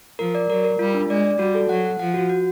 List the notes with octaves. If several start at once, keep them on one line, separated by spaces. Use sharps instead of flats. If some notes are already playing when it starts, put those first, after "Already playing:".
F3 A#4
D5
F#3 A#4
A#4
G3 F4
D4
G#3 D5
D5
G3 F#4
A4
F#3 F#5
F#5
F3 F#5
F#4
F#4